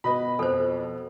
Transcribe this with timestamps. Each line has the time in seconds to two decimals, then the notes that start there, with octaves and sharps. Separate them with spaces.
0.04 B2 B4 D#5 B5
0.39 F2 A4 C5